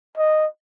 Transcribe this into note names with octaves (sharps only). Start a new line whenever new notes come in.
D#5